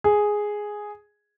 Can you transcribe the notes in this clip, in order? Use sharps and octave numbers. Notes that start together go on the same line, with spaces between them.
G#4